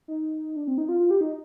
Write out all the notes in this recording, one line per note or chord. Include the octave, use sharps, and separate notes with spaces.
D#4
D4
C4
D#4
F4
F4
G4
D#4